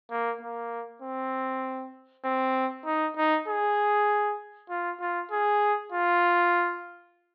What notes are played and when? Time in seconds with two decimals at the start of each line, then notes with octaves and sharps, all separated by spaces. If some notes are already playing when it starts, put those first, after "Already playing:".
0.10 A#3
0.41 A#3
1.02 C4
2.25 C4
2.86 D#4
3.17 D#4
3.48 G#4
4.70 F4
5.01 F4
5.31 G#4
5.92 F4